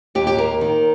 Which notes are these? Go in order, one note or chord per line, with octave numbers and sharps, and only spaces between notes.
D#2 G4
G4
A#3 A#4
D#3